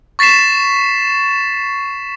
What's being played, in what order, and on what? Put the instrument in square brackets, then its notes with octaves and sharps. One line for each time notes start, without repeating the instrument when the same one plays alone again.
[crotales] C#6 A6 B6 C7 E7